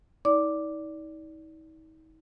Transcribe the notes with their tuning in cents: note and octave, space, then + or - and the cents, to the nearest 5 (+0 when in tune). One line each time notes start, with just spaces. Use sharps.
D#4 +40 D5 -20 D6 +0